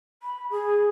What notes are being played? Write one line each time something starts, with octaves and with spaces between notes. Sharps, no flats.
B5
G#4